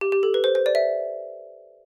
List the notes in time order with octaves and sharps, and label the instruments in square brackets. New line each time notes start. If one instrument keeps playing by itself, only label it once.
[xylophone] G4
G4
A4
B4
C5
C5
D5
E5